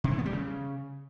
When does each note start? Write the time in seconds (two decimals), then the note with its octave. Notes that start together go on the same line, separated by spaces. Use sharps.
0.04 C3
0.11 E3
0.18 B3
0.26 G3
0.33 C#3